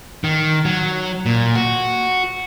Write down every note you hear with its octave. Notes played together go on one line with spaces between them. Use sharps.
D#3
F#3
A#2
F#4